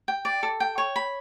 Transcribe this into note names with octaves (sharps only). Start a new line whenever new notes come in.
G5
D5
A4
G5
C#5
B5